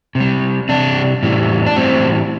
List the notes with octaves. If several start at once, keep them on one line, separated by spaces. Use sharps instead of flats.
C3
G3
C3 G3 D4
A2 E3 G3
D4
A2 E3 G3 C4